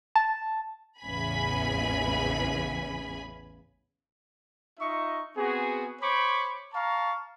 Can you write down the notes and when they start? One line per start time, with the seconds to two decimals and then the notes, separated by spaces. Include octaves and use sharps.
0.16 A5
1.02 A1 E2 C#3 G#5 B5
4.79 D#4 F4 D#5 E5 C#6
5.36 B3 C4 F#4 G#4
6.01 C5 C#5 B5 C#6 D6
6.73 F5 A5 A#5 C#6